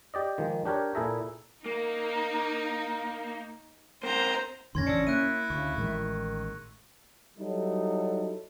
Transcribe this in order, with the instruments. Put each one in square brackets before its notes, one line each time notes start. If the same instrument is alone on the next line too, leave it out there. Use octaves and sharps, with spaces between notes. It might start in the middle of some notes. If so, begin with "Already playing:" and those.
[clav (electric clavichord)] G4 D5 D#5
D#3 F3 G#3
D4 G4 A#4 C#5
A#2 E4 G#4 A4 E5 A#5
[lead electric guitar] A#3 [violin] D#4
[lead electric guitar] A#3 C4 [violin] C5 A#5
[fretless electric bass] F2 A#2 D#3 [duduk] C#4 [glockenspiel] C6 G#6 A#6
[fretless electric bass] A1 C#3 E3 [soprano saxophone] D4 [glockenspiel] E6 A#6 C#7
[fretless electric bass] A#3 [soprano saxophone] E4 [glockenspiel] F#6 D7 D#7
[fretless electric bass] D2 [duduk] C#3 [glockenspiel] C#6
[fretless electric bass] A1 A2 G#3 [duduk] D#3
[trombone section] F#3 G3 D#4 E4 A4